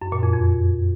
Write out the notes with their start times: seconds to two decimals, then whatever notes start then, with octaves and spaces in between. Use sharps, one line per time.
0.02 F#2
0.12 A#2
0.23 F2
0.34 F2